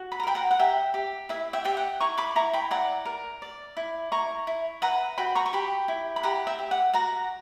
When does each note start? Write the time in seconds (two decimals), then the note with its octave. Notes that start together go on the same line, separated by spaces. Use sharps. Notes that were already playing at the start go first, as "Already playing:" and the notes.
Already playing: F#4
0.12 B5
0.20 A#5
0.23 A#4 G5 B5
0.35 F#5 A#5
0.51 F#5
0.59 G4 E5 G5
0.94 G4
1.29 E4 E5
1.53 E5 G5
1.65 G4 G5
1.77 F#5
2.00 E4 A#5 C#6
2.18 B5 D6
2.36 E4 A#5 C#6
2.53 G5 B5
2.71 D5 F#5 A#5
3.05 A#4
3.42 D5
3.77 E4
4.12 E4 A#5 C#6
4.47 E4
4.82 B4 F#5 A#5
5.18 F#4 G5 B5
5.35 A#5 C#6
5.46 C#6
5.53 G4 G5 B5
5.88 E4
6.16 B5
6.23 G4 F#5 A#5
6.47 E5 G5
6.59 G4
6.71 F#5
6.94 F#4 F#5 A#5